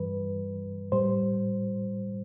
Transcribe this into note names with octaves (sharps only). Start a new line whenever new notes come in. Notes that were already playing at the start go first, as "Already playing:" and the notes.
Already playing: G2 E3 G3 B4
A2 G3 C5